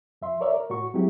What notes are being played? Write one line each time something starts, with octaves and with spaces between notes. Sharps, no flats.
F2 E5 C6
A#4 C#5 D5 E5
A#4
A2 F#4 C#6
F#3 G#3 C4 E4 G4